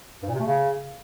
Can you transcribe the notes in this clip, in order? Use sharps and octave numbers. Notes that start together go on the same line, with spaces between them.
G2
A#2
C3
A3
C#3